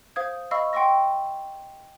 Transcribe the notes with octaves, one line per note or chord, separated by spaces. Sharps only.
C5 F5 D#6 G#6
D#5 F5 B5 C#6 E6
F#5 G5 C6 C#6 E6 A#6